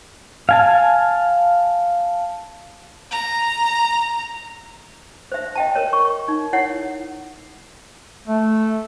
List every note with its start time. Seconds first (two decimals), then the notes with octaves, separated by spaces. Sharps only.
0.49 F5 G#5 A5
3.11 A#5
5.32 C5 E5
5.55 D#5 G5 A5
5.75 A#4 C#5
5.93 C#6
6.28 D#4
6.53 E4 C#5 F#5
8.28 A3